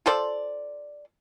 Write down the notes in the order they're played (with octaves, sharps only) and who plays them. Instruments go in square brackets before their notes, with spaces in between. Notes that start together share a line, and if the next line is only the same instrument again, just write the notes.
[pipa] F4 A4 C5 D5